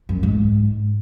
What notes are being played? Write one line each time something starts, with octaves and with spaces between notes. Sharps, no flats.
F#2
G#2